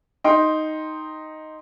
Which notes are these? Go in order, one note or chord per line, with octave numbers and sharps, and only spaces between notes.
D#4 G5 C6